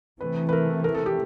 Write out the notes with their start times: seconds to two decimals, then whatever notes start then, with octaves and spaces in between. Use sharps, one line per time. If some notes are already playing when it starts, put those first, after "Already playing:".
0.20 C3 E3 A3 B4
0.49 B4
0.53 A#4
0.84 A#4
0.94 A4
1.06 G4